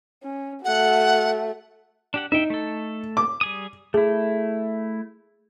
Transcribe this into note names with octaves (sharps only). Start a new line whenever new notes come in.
C#4
A3 F#4 F#5
D4 G4 F#5
D#4 E5 G5
A3 A4
D6
G3 G#4 D#6
A3 E4 G#4